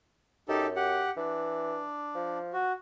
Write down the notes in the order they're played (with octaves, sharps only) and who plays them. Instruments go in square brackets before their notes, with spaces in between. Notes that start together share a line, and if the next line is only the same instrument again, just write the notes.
[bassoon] F#2 [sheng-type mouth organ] D#4 G4 A4
[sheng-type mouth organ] G4 F#5
[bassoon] E3 [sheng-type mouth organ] D4
[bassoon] F3
[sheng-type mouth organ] F#4